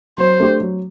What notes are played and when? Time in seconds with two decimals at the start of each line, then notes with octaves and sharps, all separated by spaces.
0.18 F#3 C5
0.40 A3 D4 G4
0.61 F#3